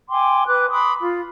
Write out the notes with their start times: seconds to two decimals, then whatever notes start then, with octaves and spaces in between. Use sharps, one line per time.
0.09 G5 G#5 C6 D6
0.47 B4 D6 F#6
0.71 B5 C6 D6 D#6
1.02 F4